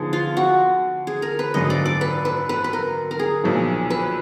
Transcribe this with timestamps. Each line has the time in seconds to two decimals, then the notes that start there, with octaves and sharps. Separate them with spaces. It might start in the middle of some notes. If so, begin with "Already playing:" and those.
Already playing: D3 F3 B3 D#4 G#4
0.13 F4
0.37 F#4
1.07 G#4
1.22 A#4
1.39 B4
1.54 G#1 F#2 D3 D#5
1.70 D5
1.86 D5
2.01 B4
2.25 B4
2.49 B4
2.64 B4
2.73 A#4
3.11 A#4
3.19 G#4
3.43 B1 A#2 F3
3.90 B4